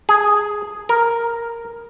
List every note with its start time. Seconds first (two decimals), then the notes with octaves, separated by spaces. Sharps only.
0.09 G#4
0.89 A#4